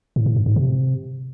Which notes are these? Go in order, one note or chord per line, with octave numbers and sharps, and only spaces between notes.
A2
A2
G2
G#2
C3